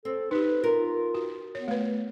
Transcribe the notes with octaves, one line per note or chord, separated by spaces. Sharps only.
C4 A4
D#4 G4 B4
F4 A#4
F#4
B3 C#5
A3 B4